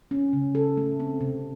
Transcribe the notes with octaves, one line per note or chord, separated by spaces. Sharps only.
C#4
C#3
A4
A3
C4
C3